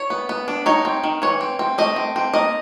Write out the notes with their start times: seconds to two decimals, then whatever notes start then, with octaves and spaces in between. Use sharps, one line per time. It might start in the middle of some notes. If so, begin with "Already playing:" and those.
Already playing: C#5
0.10 B3
0.29 B3
0.48 D4
0.66 D#4 C#5
0.85 C4
1.04 D#3
1.22 E3 C#5
1.41 C4
1.59 C4
1.78 A3 D#5
1.96 C4
2.16 C4
2.34 A#3 D#5